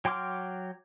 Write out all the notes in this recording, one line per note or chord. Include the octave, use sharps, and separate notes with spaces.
F#3 G5 C6 D6 F6